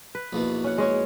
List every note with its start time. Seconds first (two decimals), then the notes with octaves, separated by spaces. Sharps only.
0.15 B4
0.33 A#1 E2 B2
0.64 C#4 F#5
0.78 G#3 C#4 C#5